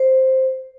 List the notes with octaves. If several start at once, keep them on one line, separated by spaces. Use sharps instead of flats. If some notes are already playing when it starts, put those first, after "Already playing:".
Already playing: C5